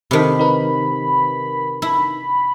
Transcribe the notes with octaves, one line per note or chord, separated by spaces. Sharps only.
C3 D#3 B5
D#4 A#4 B4
E4 B5